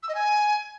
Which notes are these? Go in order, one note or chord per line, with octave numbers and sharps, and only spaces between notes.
E6
D#5
G#5